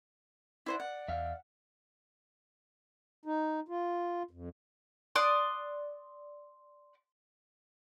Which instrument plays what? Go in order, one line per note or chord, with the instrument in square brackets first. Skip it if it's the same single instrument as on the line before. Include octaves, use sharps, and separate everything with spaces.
[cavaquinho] E4 C5 F#5 [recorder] D5
[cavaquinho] F#5
[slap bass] E2 [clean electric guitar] E5 F5
[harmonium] D#4
F4
F2
[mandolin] D5 C6 D#6 F#6